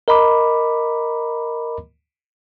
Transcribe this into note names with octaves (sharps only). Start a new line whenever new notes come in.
A#4 D#5 A#5 B5 D6